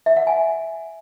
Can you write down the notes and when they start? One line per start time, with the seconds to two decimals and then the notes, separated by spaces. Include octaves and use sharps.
0.06 E5
0.17 F#5
0.27 G#5